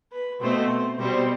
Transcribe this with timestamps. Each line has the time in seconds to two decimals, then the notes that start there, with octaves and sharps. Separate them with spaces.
0.12 B4
0.41 B2 A3 C4 C5
0.99 B2 G3 C4 C5